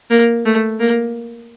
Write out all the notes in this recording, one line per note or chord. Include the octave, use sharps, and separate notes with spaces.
A#3
A3
A#3